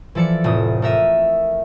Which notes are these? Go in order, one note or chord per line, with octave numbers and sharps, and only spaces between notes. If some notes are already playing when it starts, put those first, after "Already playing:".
E3 F3 A4 D5 C#7
F1 A2 D#6
A3 A#4 E5 D#7